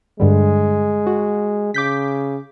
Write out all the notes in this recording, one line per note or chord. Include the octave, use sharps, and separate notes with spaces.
G2 D3 G3 G#3
F#4
C#3 D6 G6 B6